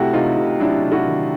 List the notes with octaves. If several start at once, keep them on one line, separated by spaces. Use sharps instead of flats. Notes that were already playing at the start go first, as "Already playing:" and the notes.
Already playing: C3 A3 E4 F#4 G4
C3 D#4 F4
C3
F#3 D4 E4
C3
E4 F#4
D#3